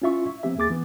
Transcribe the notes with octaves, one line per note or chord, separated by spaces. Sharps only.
C#4 E4 F4 E5 C#6
E5
F3 B3 C4 G4 E5
D#2 A#3 G#4 D6 A6
E3 B3